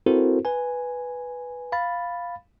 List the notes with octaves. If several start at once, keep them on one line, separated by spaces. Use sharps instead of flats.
C4 E4 F#4 A4 A#4 C5
B4 G#5
F5 B5 A6